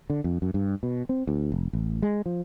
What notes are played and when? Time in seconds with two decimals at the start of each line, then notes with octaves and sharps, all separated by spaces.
0.10 D3
0.24 F2
0.42 F#2
0.54 G2
0.83 B2
1.09 C4
1.27 D2
1.52 F1
1.73 A1
2.02 G#3
2.26 F3